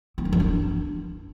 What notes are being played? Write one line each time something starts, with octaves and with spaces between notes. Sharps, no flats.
C4
D4
E3
D4